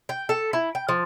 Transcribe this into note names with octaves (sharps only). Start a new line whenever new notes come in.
G5
A4
E4
G5
F3